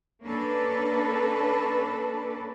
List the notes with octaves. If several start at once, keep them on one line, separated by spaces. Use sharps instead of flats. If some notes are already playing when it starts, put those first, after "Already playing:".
A#3 C#4 D4 A4 B4